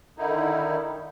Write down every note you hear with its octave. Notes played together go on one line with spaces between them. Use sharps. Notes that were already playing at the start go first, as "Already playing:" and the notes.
D3 D#3 D#4 E4